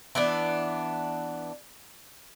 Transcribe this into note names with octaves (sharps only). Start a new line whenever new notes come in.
E3 B3 D4